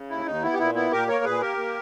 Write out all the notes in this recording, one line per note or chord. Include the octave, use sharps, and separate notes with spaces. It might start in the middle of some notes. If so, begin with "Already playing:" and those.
Already playing: C#3
D#2 E4
D#2 D#4
B3 E4
G4
A#2 E4
B3 E4
A#2 G4 A#4
A#3 A#4 C#5
A#2 G#4 B4
A#3 G4 A#4
A#3